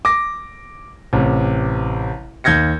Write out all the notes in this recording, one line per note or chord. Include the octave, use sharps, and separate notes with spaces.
D6 A#6
A1 C3
D#2 G6 G#6 A#6 C#7